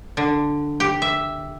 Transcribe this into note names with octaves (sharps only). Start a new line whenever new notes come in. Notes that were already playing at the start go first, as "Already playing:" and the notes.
D3
G4
E5